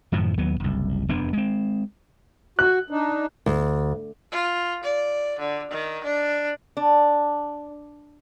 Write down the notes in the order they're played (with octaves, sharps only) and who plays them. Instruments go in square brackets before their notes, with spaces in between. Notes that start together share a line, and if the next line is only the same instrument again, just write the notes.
[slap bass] F#2 A2 D#3 F3
D#2 F#3 B3
F#1 C2
F1 E2 B3 D4
G#3 C4
[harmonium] F#4 [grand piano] F#6
[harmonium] D4 D#4
[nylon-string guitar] D2
[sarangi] F4
D5
D3
D#3
D4
[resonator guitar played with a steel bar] D4